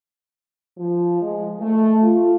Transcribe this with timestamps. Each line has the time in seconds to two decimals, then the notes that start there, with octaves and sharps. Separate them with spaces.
0.77 F3
1.21 G#3
1.60 A3
2.03 F4